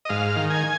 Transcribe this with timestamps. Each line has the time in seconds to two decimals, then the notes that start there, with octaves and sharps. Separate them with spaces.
0.05 D#5
0.09 G#2 F5
0.36 D#3
0.50 G#5